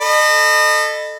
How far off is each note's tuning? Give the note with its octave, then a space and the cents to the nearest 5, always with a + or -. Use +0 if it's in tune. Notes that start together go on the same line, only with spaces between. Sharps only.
A4 +0 D#5 -30 B5 +0